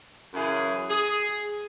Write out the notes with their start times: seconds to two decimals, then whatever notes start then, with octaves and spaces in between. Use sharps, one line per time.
0.34 F#2 C#3 E3 G#4
0.90 G#4